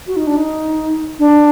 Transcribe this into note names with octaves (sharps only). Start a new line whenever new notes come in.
F#4
D#4
D4
D#4
D4